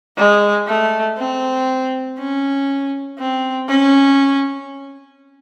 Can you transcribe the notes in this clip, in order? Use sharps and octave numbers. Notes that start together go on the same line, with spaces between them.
G#3
A3
C4
C#4
C4
C#4